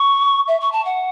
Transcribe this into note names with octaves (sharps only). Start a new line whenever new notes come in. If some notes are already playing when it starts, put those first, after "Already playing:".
Already playing: C#6
E5
C#6
A5
F#5